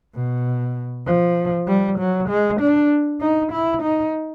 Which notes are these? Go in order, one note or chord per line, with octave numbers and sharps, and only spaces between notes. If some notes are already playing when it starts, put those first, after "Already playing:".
B2
F3
G3
F#3
G#3
D4
D#4
E4
D#4